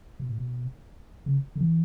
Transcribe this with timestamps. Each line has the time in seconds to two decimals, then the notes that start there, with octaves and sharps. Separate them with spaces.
0.20 B2
0.29 A2
0.38 B2
1.26 C#3
1.56 D3
1.61 E3